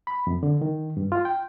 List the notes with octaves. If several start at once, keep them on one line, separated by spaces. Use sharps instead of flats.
B5
F2
D3
D#3
G2
F4
G5